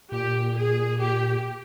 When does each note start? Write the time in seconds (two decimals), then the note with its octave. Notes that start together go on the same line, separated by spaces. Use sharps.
0.12 A#2 G4
0.57 G#4
1.01 G4